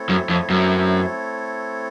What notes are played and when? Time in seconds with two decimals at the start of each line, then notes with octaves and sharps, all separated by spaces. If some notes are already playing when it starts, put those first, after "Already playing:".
Already playing: A3 C4 E4 A4 C#5
0.09 F#2
0.29 F2
0.50 F#2